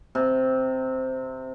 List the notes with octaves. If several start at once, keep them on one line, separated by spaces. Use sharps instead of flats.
C3